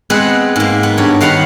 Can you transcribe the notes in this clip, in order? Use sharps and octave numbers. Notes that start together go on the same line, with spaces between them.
G#3 B3 C4 B4 F#5
G#2 A#3
B3
G2 C#5
D#3 F5 F#5 A#5 B5